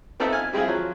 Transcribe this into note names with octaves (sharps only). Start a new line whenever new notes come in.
B3 C4 D#4 A4 E5
G#5 F6
G3 G#3 C4 E4 F4 G#4
F3 F#3